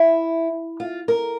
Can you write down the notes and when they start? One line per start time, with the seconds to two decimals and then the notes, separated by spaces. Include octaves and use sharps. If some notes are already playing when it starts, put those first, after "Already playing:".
Already playing: E4
0.80 F4
1.08 A#4